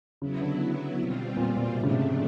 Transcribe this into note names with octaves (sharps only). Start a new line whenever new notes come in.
C#3 F#3 B3 E4
D3
B2 G3 C4 F4
A#2
A#2
G#2 C3 F3 A3 D4
C#3
C3